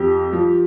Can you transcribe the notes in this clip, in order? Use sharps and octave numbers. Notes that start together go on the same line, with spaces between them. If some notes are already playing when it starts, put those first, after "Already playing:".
Already playing: F2 G4
F3